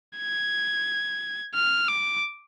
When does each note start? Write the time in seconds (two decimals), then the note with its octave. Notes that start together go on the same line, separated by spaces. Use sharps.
0.18 G#6
1.55 F6
1.88 D6